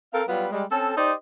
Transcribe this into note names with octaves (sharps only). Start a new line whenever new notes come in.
C4 A4 A#4 F5
F#3 G3 B3 F4 B4
G3 G#3
C4 C#4 A4
D#4 G4 C5 D5 D#5